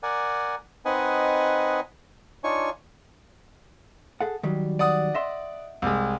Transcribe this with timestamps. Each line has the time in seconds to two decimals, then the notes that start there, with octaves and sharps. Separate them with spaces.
0.03 A#4 D5 F#5 G#5
0.85 C4 D#4 B4 D#5 F#5 G#5
2.44 D4 D#4 F4 C#5 G#5 C#6
4.21 G#4 A4 F#5
4.43 D#3 F#3 G3
4.79 D5 F#5 D#6
5.15 D#5 E5 C6
5.82 C2 G#3